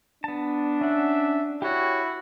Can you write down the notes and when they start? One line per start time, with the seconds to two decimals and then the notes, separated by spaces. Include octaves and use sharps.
0.24 B3 D4 A5
0.81 C#4 E5 F#5
1.62 E4 F#4 G4 C#5